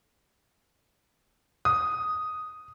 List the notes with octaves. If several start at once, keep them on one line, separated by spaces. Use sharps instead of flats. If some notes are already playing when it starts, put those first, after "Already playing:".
D#6